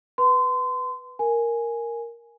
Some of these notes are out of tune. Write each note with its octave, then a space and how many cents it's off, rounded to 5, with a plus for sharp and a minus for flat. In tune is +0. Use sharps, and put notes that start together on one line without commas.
B4 +0 C6 -30
A#4 +0 G#5 +0